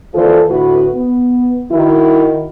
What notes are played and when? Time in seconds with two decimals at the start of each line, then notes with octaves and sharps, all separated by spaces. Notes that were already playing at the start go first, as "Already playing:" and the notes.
0.15 D#2 E3 F4 A4 C5 D5
0.49 A2 D3 E4 F#4 B4
0.95 B3
1.72 D#3 E4 F#4